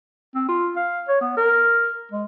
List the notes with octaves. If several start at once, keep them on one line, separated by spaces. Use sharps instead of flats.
C4
F4
F5
C#5
B3
A#4
G#3